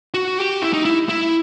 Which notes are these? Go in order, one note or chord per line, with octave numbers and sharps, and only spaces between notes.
F#4
G4
E4
D#4
E4
E4